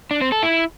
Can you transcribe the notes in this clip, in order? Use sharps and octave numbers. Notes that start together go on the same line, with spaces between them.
D4
C4
A4
E4